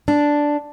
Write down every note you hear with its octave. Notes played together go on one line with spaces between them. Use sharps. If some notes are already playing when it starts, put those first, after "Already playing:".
D4